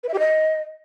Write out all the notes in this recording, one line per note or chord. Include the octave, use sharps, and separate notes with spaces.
B4
E5
G4
D#5